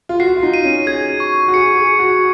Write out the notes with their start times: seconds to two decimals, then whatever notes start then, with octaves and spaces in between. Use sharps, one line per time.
0.09 F4
0.20 F#4 C7
0.37 F4
0.43 D#4
0.54 D#7
0.64 C#4
0.86 G#4 G#6
1.20 C#6
1.48 F#4
1.54 G#4 C#7
1.76 G#4
1.87 C#7
1.99 F#4